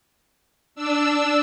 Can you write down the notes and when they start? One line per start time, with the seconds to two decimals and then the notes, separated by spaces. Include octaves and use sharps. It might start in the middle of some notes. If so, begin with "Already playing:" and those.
0.75 D4 E6